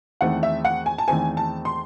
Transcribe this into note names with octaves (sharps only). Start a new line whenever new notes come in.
E2 D#3 A3 C4 F#5
E5
F#5
G#5
A5
E2 D#3 A3 C4 G#5
A5
C6